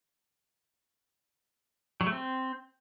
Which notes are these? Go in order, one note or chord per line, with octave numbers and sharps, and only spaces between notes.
F#3
A3
C4